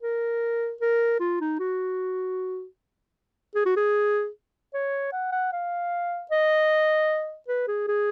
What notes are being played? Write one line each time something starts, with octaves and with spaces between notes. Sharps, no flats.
A#4
A#4
F4
D#4
F#4
G#4
F#4
G#4
C#5
F#5
F#5
F5
D#5
B4
G#4
G#4